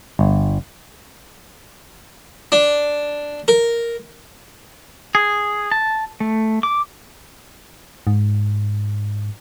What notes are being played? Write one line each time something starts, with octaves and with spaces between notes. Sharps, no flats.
G1
D4
A#4
G#4
A5
A3
D6
G#2